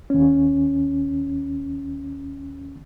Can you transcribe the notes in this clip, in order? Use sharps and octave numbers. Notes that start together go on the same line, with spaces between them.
D#2 C#4